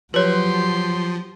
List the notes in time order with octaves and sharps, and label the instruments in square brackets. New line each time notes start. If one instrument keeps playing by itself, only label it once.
[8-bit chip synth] F3 [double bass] F#3 [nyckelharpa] G4 C6 [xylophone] B4 C#5